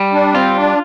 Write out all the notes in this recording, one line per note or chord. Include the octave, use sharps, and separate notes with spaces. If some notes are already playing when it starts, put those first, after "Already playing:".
Already playing: G3
D4
C4 F4
D4